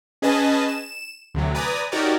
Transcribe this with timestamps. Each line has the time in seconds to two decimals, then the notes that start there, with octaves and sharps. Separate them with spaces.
0.22 C#4 G#4 B4 D#5 G#5 A5
0.68 E7
1.35 D2 C3 F#3
1.55 B4 D5 G#5 A#5 D#6
1.92 D#4 F#4 G4 A#4 C#5 D5